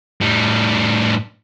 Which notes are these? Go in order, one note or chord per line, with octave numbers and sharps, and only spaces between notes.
A2 G3